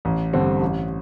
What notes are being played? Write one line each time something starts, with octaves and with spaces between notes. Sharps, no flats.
A1
G2 D3 G3 C4
A1